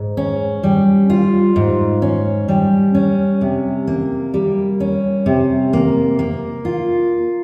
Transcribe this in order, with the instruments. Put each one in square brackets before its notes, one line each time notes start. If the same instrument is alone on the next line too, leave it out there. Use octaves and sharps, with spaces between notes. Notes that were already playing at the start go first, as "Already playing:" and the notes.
Already playing: [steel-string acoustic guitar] G#2
C#4
G3
F4
G#2
C#4
G3
C#4
C3
A#3
G3
C#4
C3
A#3
A#3
F4